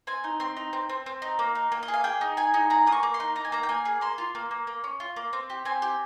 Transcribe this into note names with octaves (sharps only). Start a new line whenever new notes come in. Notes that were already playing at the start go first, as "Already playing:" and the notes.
C4 G#5
D#4
C4 C6
D#4
C4
C4
C4
D#4
A#3
D#4
A#3
D#5
G#4
F5
G#4 G5
D#4
G#4 G#5
D#4
G#4 A#5
A#3 D#6
C#6
A#3
C6
D#4
D#4 A#5
G#5
A#3 A#5
G5
A#3 G#5
G#4
A#3 C6
F4
A#3
A#3
A#3
C#4
F4
A#3
C4
G4
C4 G#5
G4